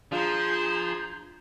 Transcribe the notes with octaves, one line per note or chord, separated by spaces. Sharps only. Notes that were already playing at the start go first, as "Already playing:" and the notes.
F3 D4 F4 G#4 A#5 C6 G6 G#6